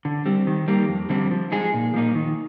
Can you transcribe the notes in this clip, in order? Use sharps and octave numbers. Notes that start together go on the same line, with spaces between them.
D3
G3 C4
D#3
G3 A#3
F2
D3 G3 C4
F3
G#3 D#4 G#4
A#2
F3 A#3 D#4
D#3